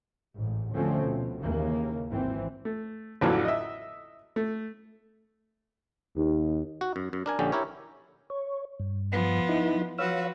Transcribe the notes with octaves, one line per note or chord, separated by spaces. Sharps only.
A1 G#2
D2 D3 F3 A3 C4 C#4
B2
D#2 C#3 E3 A#3
G#1 E3 C4
A3
A1 F2 D3 E3 F#3
D#5 E5
A3
D#2
F#4
F#2
F#2
D4 A#4 G#5
A#1 D3 C#4 G4
E4 G4 A#4 C#5
C#5
G2
F3 B3
D#4 E4
F3 F#4 B4 C#5 F5 E6